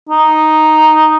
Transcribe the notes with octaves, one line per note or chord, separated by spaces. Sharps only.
D#4